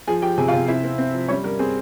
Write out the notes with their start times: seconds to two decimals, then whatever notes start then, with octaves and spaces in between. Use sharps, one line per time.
0.08 F3 G#4 G#5
0.22 F3 G4 G5
0.38 C3 G#4 G#5
0.48 F4 F5
0.54 C3
0.68 C4 E4 E5
0.84 C4
0.98 C4
1.14 F3
1.28 G3 C#4 C#5
1.44 G3 A#4
1.59 C4 G#4